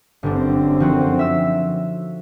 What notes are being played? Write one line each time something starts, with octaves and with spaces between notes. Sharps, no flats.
G1 F#2 D3 C4 D4
F3 D#4 F#4
E5 E6